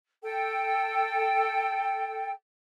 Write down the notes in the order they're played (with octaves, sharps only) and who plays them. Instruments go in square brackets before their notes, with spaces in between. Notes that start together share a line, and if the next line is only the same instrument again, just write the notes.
[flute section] A4 G5